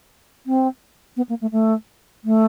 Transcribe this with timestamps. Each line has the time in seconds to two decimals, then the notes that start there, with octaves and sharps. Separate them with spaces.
0.46 C4
1.17 B3
1.29 A#3
1.41 A3
1.52 A3
2.24 A3